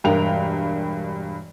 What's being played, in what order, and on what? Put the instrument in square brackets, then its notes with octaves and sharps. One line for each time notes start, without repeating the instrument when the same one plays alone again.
[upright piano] E1 G2 A#4 G5 F7